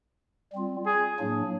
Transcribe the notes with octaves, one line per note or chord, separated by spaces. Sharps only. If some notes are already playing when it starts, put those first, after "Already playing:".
G3 C4 F4
G#4
A2 F#3 A#3 D4